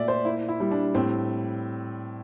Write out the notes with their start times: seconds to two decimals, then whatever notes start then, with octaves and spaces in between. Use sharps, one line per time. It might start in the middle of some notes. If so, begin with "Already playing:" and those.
Already playing: A#2 A3 D5 E5
0.08 C5
0.25 A#3 E4
0.48 E4
0.60 G3
0.71 D4
0.95 A2 C4